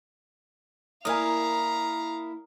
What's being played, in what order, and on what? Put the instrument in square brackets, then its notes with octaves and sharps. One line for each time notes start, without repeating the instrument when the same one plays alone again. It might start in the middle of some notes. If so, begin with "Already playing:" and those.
[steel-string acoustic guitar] A#3 E4 [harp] A#4 D5 G#5 [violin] F5 A#5 [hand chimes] D#6